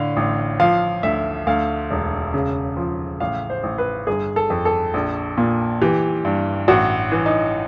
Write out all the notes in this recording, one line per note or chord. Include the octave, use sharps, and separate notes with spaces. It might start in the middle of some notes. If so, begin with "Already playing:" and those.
Already playing: A2 D3 F5
A1
F3 F5
D2 E5
D2 F5
E1
C#3
F3
A1 F5
C5
A1
B4
G1 G#4
A4
F2
A4
A#1
A#2
E3 G4
G2
A1 F#4
E3
D#4